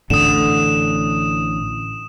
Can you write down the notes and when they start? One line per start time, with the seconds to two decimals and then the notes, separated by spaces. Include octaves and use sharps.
0.10 A1 A2 D3 D#6 E7